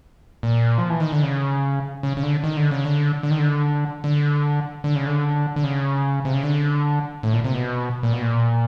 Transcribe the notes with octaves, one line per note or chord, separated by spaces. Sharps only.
A#2
F3
E3
D#3
D3
C#3
C#3
C#3
D3
D#3
D3
C#3
D3
D3
D#3
D3
D3
D3
C#3
D3
D3
C#3
C3
C#3
D3
A2
A#2
C3
B2
A#2
B2
A#2